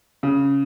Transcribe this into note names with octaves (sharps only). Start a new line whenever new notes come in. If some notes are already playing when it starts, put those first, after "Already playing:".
C#3